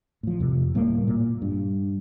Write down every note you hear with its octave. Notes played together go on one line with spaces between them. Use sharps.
A2 F3
F2 C3
D1 A2 G3 A#3
A#2
G2